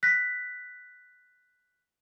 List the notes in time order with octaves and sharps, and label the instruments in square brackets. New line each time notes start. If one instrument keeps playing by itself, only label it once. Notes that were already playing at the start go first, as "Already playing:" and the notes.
[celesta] F#6 A#6 B6